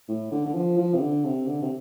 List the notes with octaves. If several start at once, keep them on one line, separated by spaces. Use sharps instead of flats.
A2
D3
D3
F3
F3
C3
D3
C3
D3
C3